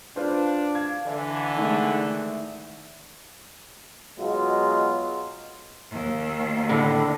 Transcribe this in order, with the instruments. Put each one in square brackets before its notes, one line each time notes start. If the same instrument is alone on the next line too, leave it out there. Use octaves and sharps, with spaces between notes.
[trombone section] D4 [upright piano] F4 B4 C5
[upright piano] F5 G#6
[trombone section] D3 E3
[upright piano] D#3 G#3 A3
[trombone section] B2 F#3 G#3 F4
[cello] D#2
[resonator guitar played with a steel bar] A2 D3